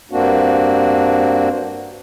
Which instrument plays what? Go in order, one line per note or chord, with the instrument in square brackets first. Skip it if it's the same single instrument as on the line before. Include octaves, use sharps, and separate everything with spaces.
[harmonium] G2 A#3 C4 D4 F#4